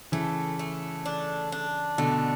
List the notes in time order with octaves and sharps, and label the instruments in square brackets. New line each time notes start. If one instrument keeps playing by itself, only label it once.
[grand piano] C#3 E3 [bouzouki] A3
[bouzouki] A3
D4
D4
[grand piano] B2 D3 [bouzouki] A3